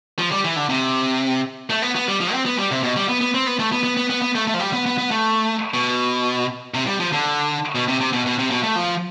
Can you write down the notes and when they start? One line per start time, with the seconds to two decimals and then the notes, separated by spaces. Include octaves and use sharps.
0.19 F3
0.32 G3
0.44 E3
0.56 D3
0.69 C3
1.70 A3
1.82 B3
1.96 B3
2.08 G3
2.21 F3
2.33 C4
2.46 B3
2.58 G3
2.71 C3
2.83 B2
2.96 G3
3.09 B3
3.21 B3
3.34 C4
3.47 B3
3.59 A3
3.72 B3
3.84 B3
3.97 B3
4.10 B3
4.22 B3
4.35 A3
4.47 A3
4.54 F3
4.59 G3
4.73 B3
4.86 B3
4.98 B3
5.11 A3
5.74 B2
6.74 C3
6.87 G3
7.00 F3
7.13 D3
7.75 B2
7.88 C3
8.00 C3
8.13 B2
8.26 B2
8.38 C3
8.50 B2
8.63 A3
8.76 F3